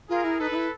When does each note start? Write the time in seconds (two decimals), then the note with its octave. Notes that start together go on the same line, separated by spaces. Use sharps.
0.09 F4 G#4 A#4
0.24 E4
0.39 D#4 A4 B4
0.51 D#4
0.55 E4